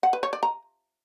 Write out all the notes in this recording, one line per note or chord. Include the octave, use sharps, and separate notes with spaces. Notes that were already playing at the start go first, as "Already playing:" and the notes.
F#5
B4
C#5
D5
A#5